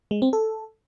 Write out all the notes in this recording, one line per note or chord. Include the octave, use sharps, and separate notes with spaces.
G#3
C4
A4